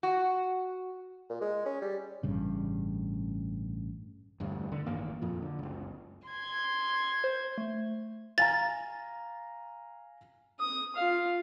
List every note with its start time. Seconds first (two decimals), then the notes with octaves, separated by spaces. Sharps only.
0.03 F#4
1.29 A#2
1.41 G#3
1.66 C#4
1.82 G3
2.23 A1 G2 C#3
4.40 E1 D2 G2
4.72 D3
4.86 A1 G2 D#3 A#3
5.21 F2 A#2 F3
5.43 D3
5.59 F#1 C#2
6.27 C6 G#6
7.24 C5
7.58 A3
8.38 F5 G#5 A#5 A6
10.60 D#6
10.96 F4 F5